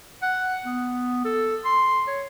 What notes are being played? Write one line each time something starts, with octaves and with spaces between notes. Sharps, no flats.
F#5
B3
A4
C6
C#5